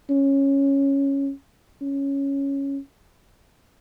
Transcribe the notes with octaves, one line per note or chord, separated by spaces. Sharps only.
C#4
C#4